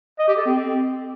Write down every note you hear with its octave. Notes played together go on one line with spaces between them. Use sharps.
D#5
G4
A4
C4